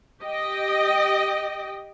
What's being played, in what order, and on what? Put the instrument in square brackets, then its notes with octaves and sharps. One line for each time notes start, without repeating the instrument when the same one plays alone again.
[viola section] G4 D#5 G5